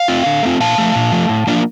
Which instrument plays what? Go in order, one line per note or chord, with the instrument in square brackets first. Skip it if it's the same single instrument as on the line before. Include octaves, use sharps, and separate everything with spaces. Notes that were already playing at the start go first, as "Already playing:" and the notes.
Already playing: [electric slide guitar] F5
A3 C4 F4
D3
A3 C4 F4
A#2 F5 A5
F3 A3
A#2
F3 A3
A2
F3 A#3 D4 F4